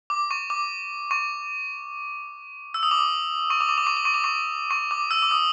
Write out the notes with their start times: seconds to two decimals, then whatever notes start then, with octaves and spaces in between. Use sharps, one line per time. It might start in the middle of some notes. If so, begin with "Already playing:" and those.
0.10 D6
0.31 C#6
0.50 D6
1.11 C#6
2.74 E6
2.83 D#6
2.91 D6
3.50 C#6
3.60 D6
3.69 C#6
3.78 D6
3.87 C#6
3.97 D6
4.05 C#6
4.14 D6
4.24 C#6
4.71 C#6
4.91 D6
5.11 E6
5.22 D6
5.31 D#6